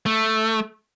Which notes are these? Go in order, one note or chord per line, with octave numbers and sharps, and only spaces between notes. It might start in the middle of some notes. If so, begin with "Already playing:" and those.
A3